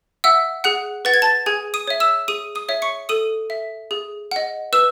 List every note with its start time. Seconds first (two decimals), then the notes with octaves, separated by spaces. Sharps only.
0.24 E5 F#5 E6
0.64 G#4 F#5 F#6
1.05 B4 F#5 A6
1.14 G#6
1.22 A5 A6
1.46 G#4 G#5 G#6
1.74 D#6 D#7
1.87 C#5 E5
2.00 E6 E7
2.28 G#4 D#6 D#7
2.55 D#6 D#7
2.69 C#5 E5
2.82 C#6 C#7
3.09 A4 D#6 D#7
3.50 E5
3.91 G#4
4.31 D#5 F#5
4.73 B4 E6 E7